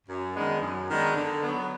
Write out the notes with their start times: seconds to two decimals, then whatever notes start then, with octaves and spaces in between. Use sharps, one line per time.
0.07 F#2
0.35 D#3 G#3 B3 D4
0.61 F#2
0.88 D#3 G#3 B3 D4
1.15 D3
1.42 F#3 B3